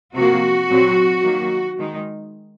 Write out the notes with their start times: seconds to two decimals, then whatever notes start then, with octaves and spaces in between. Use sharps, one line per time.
0.16 C3 F3 A#3 F#4
0.70 A#2 F#3 C4
1.23 D#3 F#3 A#3
1.78 D#3 G#3 D#4